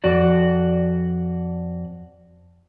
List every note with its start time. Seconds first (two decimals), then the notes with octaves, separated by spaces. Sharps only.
0.04 F2 F#4 D5